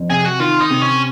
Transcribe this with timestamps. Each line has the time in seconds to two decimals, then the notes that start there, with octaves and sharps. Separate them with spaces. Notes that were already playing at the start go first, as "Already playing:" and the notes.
Already playing: F2
0.10 C3 G#4
0.25 F#4
0.40 D#3 F4
0.61 D#4
0.71 C3
0.81 C#4